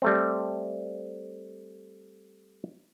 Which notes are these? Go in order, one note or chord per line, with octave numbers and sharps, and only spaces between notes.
G3 A3 C4